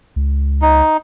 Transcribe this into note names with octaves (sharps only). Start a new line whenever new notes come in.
C#2
D#4